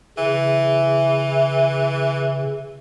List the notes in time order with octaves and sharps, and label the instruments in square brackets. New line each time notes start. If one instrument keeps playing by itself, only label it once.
[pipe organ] C#3 [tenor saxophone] E3